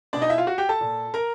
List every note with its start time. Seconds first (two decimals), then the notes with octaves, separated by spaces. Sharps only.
0.13 B2 D4 D5
0.22 D#4 D#5
0.30 E4 E5
0.38 F4 F5
0.47 F#4 F#5
0.58 G4 G5
0.69 A4 A5
0.81 A#2
1.14 A#4 A#5